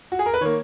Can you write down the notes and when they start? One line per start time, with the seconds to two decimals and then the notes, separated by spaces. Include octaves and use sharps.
0.12 F#4
0.19 G#4
0.26 A#4
0.34 B4
0.41 D#3 A#3 C#5